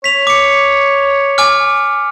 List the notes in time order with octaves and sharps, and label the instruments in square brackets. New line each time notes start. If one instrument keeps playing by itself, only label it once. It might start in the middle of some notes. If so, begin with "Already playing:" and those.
[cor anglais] C#5 [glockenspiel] B6 F7
[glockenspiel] D6 C#7
G#5 D6 F6